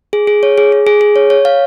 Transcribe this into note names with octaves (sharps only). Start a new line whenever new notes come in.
G#4
G#4
C#5
G#4
G#4
G#4
G#4
C#5
C#5
F5